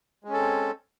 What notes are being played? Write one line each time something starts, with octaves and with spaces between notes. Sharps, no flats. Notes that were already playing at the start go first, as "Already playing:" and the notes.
G#3 C4 C#4 A4